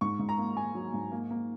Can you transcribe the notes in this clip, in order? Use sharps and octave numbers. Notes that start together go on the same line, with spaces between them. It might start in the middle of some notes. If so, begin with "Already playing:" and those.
G#2 C#6
G#2
A#5
A#3
A#3 G#5
F#3
G#2
A#3
A#3